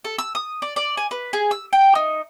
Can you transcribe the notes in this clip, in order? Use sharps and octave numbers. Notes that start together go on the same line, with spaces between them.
A4
E6
D#6
D5
D5
G#5
B4
G#4
E6
G5
D#4